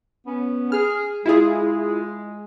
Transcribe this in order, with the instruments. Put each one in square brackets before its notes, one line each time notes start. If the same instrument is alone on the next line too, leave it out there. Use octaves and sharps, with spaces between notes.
[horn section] B3 C#4
[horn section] G#4 [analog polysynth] F6
[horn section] G#3 [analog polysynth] E4 F4 G#4